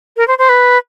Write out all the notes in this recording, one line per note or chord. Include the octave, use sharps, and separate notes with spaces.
A#4
C5
C5
B4